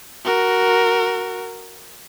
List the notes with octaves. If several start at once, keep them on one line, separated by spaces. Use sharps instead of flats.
F#4 A#4